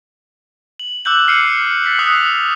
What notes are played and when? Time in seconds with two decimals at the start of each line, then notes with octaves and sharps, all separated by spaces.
0.80 F#7
1.05 D6 E6 F#6 G6 F#7
1.27 F6 C7 C#7 D#7
1.84 A6 B6 C#7 F#7
1.99 D#6 F#6 C7 F7